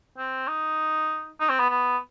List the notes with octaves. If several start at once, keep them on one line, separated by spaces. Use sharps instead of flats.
C4
D#4
D#4
C4
B3
B3